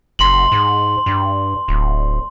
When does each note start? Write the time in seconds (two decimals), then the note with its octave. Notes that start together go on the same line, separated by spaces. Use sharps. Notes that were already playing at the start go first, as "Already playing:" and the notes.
0.19 F#1 C6 F#7
0.52 G#2
1.06 G2
1.68 D1